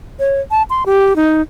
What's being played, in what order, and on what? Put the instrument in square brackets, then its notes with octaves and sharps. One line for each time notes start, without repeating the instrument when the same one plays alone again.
[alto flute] C#5
A5
C6
G4
D#4